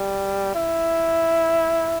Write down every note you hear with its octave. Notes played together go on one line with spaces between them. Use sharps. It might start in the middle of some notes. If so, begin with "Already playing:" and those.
Already playing: G3
E4